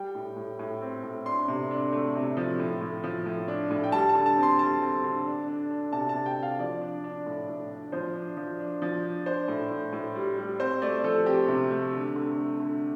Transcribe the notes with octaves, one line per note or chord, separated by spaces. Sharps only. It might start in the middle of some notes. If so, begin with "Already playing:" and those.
Already playing: G3 G5
A2
A2
A2
C4
A2
D4 C6
C3
D4
A3
C3
F3
A2
A2
F3
A2
D4
A2
G5
G3 A5
A5
D3
A5
C4
C6
G3 A5
C4
D3
D4
D4
D4
C3 A5
A5
C3
G5
C3
F5
F3 D5
D4
D4
A2
A2
D4
F3 C5
D4
F3
D4
F3
D4
D4 C5
A2
A2
A2
G3
G3
C4 C5
A3 D5
F3 A4
C4 G4
C3
A3
D3
D3
A3
D3